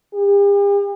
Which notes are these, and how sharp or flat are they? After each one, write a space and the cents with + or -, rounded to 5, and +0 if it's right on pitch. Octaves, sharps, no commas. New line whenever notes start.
G4 +45